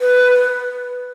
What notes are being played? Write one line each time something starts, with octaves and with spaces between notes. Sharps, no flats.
B4